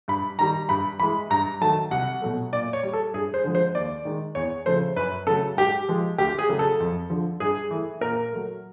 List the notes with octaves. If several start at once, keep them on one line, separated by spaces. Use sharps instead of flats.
G2 B5
D#3 G3 A#5
G2 B5
E3 G#3 B5
G2 A#5
D#3 F#3 A3 A5
C2 F#5
B2 F#3 A3
A#2 D5
C#5
G3
A4
G2 G#4
C5
D3 F3 G#3
C5
D#2 D5
D#3 G#3
E2 C#5
C#3 F3 A3 C5
F#2 B4
C#3 F#3 A3 A4
G#2 G4
F3 G#3
D2 G4
G#4
C#3 F#3 A3
A4
F2
D3 F3
G2 G#4
E3 A3
A#2 A#4
F#3 A3